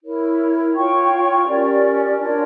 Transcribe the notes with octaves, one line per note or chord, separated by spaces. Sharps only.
E4 A#4 C#5
F4 C#5 G5 C#6
C#4 G4 A#4 D5
D4 F4 A#4 C#5